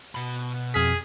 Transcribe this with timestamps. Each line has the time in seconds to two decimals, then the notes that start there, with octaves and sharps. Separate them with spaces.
0.15 B2 B5
0.74 F2 G#4 F6 B6